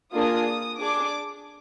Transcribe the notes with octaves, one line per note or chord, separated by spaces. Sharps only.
A#3 D4 F4 G#4 D#6
D4 G#4 D6